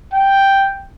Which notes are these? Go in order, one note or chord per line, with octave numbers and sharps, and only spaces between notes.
G5